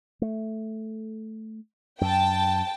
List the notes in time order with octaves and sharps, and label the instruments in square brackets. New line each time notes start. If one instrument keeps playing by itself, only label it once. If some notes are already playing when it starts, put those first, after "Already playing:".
[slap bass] A3
[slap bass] F#2 [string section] G5 A5